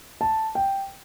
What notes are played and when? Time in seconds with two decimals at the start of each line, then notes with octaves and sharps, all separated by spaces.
0.21 A5
0.55 G5